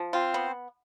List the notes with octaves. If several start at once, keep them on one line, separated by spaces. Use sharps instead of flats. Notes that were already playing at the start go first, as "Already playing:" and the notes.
Already playing: F3
C4 F4 C5
B3